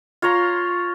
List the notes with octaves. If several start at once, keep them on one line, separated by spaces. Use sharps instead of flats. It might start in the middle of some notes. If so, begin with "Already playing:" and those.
F4 C#5 A#5 C6